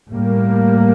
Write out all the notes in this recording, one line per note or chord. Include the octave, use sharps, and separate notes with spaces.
A2 G3 A#3